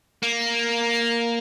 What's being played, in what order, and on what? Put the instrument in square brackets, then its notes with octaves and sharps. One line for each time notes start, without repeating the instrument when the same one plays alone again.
[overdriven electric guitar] A#3